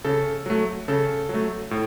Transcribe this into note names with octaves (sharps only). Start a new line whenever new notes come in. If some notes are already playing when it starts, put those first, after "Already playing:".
C#3 A4
F#3 A3
C#3 A4
F#3
A3
A2